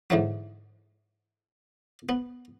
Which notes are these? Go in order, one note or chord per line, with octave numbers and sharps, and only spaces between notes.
G#2 D3 E3 F#3
B3